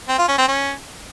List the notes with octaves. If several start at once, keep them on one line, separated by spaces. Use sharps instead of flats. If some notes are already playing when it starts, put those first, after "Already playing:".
C4
F4
C#4
C4
C#4